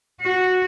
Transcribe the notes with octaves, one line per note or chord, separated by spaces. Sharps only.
F#4